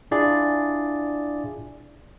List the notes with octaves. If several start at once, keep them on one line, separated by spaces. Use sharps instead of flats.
D4 E4 F4 G#4 D5